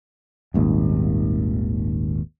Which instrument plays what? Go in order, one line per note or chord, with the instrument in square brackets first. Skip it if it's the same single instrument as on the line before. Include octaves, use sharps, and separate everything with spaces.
[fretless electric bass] D#1 G#1 D#2